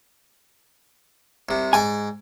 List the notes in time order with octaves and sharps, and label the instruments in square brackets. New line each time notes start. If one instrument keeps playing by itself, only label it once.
[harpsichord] C2 C3
[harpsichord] G#2 D5 D6 [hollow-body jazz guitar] G#5